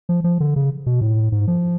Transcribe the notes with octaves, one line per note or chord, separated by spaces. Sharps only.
F3
F3
D3
C#3
B2
A2
G#2
F3